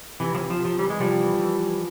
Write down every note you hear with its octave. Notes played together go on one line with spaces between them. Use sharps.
C3 E3
F3
E3
F3
C3
F3
E3 G3
G#3
C3 F3 G3
E3
E3
E3